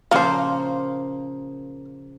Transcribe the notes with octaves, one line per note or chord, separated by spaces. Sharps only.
A#2 C#3 F3 A#3 C5